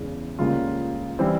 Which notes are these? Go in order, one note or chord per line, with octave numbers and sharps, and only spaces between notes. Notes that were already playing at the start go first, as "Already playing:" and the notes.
Already playing: E2 C#3 E3 G#3
C#2 C#3 G3 A#3 F4
E3 G3 C4